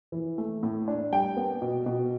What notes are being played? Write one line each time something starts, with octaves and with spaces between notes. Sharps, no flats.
E3
A3
A2
D4
G3 G5
B3
B2
B2